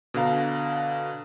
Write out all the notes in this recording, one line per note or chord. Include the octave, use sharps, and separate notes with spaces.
B2 D3 F5 A#5